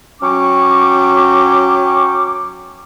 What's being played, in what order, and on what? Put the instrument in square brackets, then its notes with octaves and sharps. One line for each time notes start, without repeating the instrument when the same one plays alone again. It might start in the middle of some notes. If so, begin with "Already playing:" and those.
[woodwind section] F#3 C#4 G5 C#6 D6